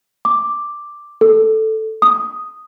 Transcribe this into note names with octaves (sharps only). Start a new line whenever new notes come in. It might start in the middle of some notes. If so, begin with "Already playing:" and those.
D6
A4
D#6